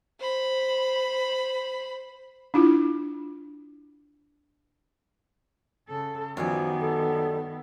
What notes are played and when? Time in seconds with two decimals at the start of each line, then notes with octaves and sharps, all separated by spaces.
0.19 C5 B5
2.54 D4 E4 F4
5.88 C#3 A4
6.37 F#2 D#3 F3 G3 B3 G#5
6.81 A4